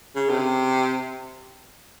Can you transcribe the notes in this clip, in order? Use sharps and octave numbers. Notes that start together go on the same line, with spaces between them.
C#3
C3